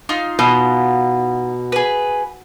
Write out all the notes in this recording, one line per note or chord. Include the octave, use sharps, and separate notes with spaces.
D#4 F4 C6
B2
G#4 B4